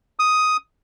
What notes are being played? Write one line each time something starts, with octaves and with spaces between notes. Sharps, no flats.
D#6